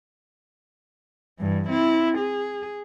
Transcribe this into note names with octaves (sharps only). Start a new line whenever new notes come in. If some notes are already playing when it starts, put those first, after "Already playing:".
G2 E3
C4 E4
G#4